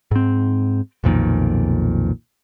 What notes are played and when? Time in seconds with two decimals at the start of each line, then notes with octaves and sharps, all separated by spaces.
0.11 G#2 C4
1.04 B1 F2 A#2 D#3